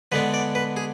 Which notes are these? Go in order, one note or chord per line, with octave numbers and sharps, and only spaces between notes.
D3 G#3 B3 D4 B4
D5
B4
G#4